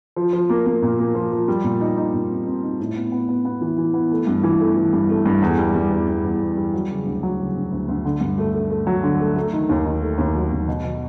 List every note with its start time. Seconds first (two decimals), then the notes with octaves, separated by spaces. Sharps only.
0.16 F3
0.33 F3
0.49 A#3
0.66 A#3
0.82 A#2
0.99 A#3
1.15 F3
1.32 F3
1.48 G3
1.64 A#2
1.81 D#4
1.98 D#4
2.14 A#2
2.30 C4
2.47 C4
2.63 D#4
2.79 A2
2.95 B3
3.12 B3
3.29 B3
3.45 B3
3.61 E3
3.78 E3
3.94 B3
4.11 A3
4.27 G2
4.44 E3
4.60 A3
4.77 E3
4.93 G2
5.09 A3
5.26 G2
5.42 E2
5.58 G3
5.75 G3
5.91 E2
6.08 G3
6.25 E2
6.41 E2
6.57 G3
6.74 F#3
6.90 C#3
7.06 D2
7.23 F#3
7.39 C#3
7.56 D2
7.72 D2
7.88 D2
8.05 D3
8.21 G2
8.38 A3
8.54 A3
8.70 A3
8.87 F#3
9.04 D3
9.20 A3
9.36 A3
9.53 D#3
9.69 D#2
9.86 D#3
10.02 A3
10.18 D#2
10.35 F#3
10.52 D#2
10.68 B2
10.84 B2